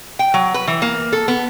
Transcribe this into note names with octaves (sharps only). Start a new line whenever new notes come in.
G5
F#3
B4
E3
A#3
A4
B3